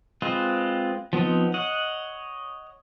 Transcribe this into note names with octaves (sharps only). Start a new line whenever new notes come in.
G#3 C4 F4 B4 D#5
F3 B3 C4 D#4
C#5 D#5 F#5